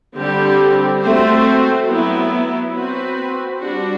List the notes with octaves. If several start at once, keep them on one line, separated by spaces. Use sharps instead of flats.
D3 G3 C4 G4
A3 C4 F#4 C5
F#3 B3 E4
C4 F#4 B4
G3 D4 F#4